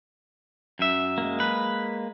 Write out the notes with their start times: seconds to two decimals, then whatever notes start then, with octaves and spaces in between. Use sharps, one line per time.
0.79 F#2 E5
1.18 G#3 A#3
1.40 B4